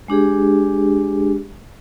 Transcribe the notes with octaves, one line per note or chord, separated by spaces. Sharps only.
G#3 D4 G4 G#4